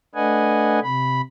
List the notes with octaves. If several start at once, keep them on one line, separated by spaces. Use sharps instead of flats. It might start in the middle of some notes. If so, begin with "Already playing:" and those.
A3 D4 B4 D#5 F#5 G#5
C3 B5